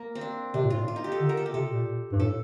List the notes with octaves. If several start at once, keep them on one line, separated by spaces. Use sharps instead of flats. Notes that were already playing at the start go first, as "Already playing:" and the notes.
Already playing: A#3
C4
D4
C3 D4
A#2
A2 F4
F4
D#4
G4
A4
D3
A#4
A4
G4
C3 A4
A#2
G2
A2 A4